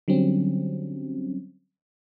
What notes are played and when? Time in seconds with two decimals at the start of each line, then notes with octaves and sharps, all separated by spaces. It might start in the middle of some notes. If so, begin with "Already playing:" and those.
0.08 D3 F#3 G3 C4 C#4